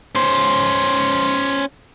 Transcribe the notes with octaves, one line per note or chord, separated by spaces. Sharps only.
C#4 C5